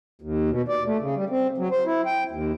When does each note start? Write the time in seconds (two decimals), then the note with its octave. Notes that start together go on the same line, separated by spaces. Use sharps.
0.22 D#2
0.50 B2
0.68 D5
0.86 A3
1.01 C#3
1.15 G3
1.30 C4
1.58 F#3
1.72 C5
1.86 E4
2.06 G5
2.31 D#2